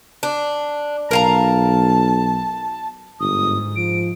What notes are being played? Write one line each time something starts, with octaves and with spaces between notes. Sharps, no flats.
D4
B1 A#4 F5 A5 A#5
G1 G#2 D#6
F3 D7